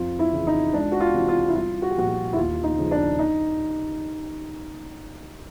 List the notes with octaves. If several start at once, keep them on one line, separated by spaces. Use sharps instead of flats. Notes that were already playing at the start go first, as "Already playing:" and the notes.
Already playing: F2 F4
E4
C#3 E3
D#4
C#2 D4
F#4
F4
C3 E3
F4
E4
C2 F4
F#4
G4
A#2 F3 F#4
F#4
E4
D#2 F4
D#4
C#3 F3
D4
D#4